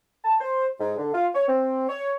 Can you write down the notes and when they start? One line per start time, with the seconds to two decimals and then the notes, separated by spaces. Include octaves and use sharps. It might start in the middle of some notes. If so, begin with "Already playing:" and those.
0.24 A5
0.40 C5
0.80 G#2
0.98 D3
1.14 F4
1.34 C#5
1.48 C4
1.89 C#5